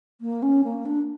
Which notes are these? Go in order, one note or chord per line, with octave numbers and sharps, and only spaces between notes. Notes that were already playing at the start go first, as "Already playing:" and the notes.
A#3
C#4
A#3
D4